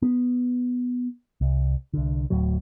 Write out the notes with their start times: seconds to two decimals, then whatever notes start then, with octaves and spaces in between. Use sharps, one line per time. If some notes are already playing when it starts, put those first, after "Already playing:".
0.02 B3
1.41 C2
1.93 C2 D3
2.30 D1 A2 F#3